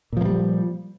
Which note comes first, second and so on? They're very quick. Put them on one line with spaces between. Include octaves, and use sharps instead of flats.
A#2 F3 A#3 G3